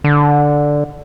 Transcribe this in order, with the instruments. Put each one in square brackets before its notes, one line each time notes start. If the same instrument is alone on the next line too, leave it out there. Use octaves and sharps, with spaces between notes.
[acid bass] D3